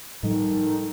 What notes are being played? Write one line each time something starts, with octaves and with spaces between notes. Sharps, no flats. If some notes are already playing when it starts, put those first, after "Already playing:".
A2 D#3 F3 G3 D#4 A4